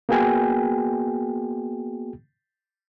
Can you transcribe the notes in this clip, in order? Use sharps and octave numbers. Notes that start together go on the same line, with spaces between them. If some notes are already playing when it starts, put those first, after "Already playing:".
A#3 B3 F#4 G#4 G5 G#5